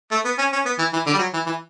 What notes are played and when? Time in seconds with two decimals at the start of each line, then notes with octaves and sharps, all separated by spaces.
0.11 A3
0.25 B3
0.38 C#4
0.52 C#4
0.66 B3
0.78 E3
0.93 E3
1.07 D3
1.13 G3
1.19 F#3
1.33 E3
1.46 E3